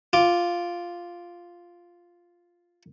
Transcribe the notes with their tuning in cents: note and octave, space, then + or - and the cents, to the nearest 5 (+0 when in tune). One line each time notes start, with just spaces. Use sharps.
F4 +0 D6 +0